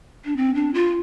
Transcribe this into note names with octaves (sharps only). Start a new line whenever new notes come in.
D4
C4
D4
F4